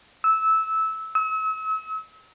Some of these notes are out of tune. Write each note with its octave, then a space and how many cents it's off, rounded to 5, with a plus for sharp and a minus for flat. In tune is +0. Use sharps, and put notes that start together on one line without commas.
E6 -15
E6 -40